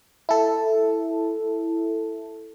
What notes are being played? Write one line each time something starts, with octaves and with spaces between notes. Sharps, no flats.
E4 A4